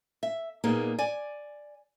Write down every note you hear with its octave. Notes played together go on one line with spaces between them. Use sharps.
E5
A#2 G3 A#3 B3 D#4 G#4
D5 G#5